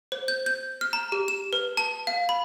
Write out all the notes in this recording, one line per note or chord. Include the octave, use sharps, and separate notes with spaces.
C5
G6
G6
F6
A#5
G4
E7
B4
A5
F5
B5